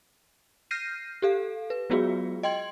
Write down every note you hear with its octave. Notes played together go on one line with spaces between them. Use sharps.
F6 G6 A#6 C7 D#7
G4 A4 F5
B4
F#3 G#3 B3 F4 F#4 G#4
D#5 G5 C6 G#6 F#7